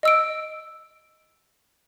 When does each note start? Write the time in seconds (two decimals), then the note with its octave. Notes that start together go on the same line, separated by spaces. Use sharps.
0.03 D#5 E6 D7